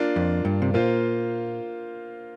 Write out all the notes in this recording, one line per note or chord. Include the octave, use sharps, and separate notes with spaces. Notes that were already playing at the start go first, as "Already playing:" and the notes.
Already playing: A#3 D4 F4
F2
G2
C3
A#2 A#3 F4 C5